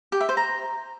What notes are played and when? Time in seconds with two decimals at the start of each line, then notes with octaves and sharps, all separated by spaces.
0.12 G4
0.20 E5
0.29 C5
0.37 A#5